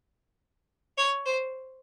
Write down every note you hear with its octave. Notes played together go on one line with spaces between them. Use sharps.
C#5
C5